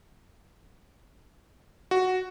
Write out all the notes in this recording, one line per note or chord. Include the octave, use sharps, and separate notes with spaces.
F#4